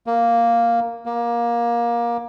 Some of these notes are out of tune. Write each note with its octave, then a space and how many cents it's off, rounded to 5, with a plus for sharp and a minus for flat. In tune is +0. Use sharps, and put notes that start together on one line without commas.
A#3 +0
A#3 +20